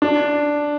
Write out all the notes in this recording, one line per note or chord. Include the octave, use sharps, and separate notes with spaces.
D4